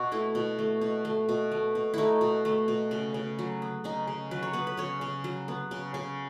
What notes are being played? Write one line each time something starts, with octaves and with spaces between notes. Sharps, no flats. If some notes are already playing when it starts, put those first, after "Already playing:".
Already playing: B2 F#4
A3 E4
B2
A3
B2
A3
B2
A3
B2
A3 D#4 E4
B2
A3
B2
C#3
C#3
F#3
B3
C#3 D#4
C#3
F#3 B4
C#5
B3 B4
B4
C#3 C#5
C#3
F#3
B3
C#3
C#3